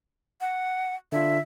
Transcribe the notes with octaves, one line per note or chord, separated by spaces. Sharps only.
F#5
D3 D4 F4 E5